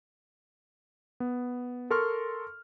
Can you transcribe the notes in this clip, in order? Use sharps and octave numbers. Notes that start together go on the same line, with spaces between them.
B3
A4 A#4 C6 C#6 F6